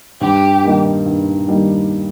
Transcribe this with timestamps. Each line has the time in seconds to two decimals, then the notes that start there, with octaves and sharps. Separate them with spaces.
0.21 G2 G4
0.64 D#3 G3 A#3 D#4
1.06 G2
1.48 D#3 G3 A#3 D#4